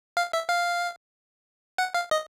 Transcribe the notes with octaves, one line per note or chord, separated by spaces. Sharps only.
F5
E5
F5
F#5
F5
D#5